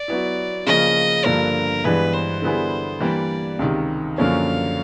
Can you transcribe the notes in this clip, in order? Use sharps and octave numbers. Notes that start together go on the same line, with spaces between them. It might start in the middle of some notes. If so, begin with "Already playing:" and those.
Already playing: D5
F#3 B3 E4
C#3 F3 A#3 D#5
G2 D3 F3 A#3 D4 A#4
G2 E3 G#3 B3 D4 B4
C5
D3 G3 B3 E4 G#4
E3 G3 A#3 D4 G4 D5
C#2 C3 D#3
F#2 D3 F3 A#3 C#4 F5